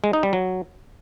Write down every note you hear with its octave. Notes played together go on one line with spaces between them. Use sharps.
G#3
D#4
G3
F#3